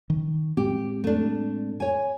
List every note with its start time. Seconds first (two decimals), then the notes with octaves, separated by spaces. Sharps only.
0.10 D#3
0.57 A2 G#3 C4 G4
1.04 A3 D4
1.80 C#5 G#5